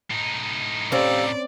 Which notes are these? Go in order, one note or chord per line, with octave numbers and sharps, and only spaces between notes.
A2 D#4
C4 C#4 G4 D5 F5 E6